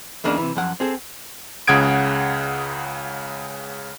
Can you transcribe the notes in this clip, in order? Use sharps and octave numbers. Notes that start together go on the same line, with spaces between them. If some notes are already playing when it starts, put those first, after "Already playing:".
E2 C#3 A#3 D4 D#4
C3 E3
F#2 F3 F#5
C4 G#4 A4
C#2 C#3 F#5 D#6 G#6 D7